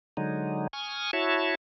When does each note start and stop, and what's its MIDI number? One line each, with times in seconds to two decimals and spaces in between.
0.17 0.67 50
0.17 0.67 54
0.17 0.67 56
0.17 0.67 63
0.73 1.11 80
0.73 1.11 85
0.73 1.11 87
0.73 1.11 89
1.13 1.55 64
1.13 1.55 66
1.13 1.55 73
1.13 1.55 76
1.13 1.55 81